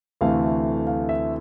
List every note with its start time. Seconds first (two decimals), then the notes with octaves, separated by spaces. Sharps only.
0.21 D2 C3 E3 A3 F5
0.87 F5
1.09 E5